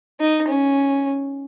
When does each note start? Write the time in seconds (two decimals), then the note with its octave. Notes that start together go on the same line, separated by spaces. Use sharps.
0.20 D#4
0.48 C#4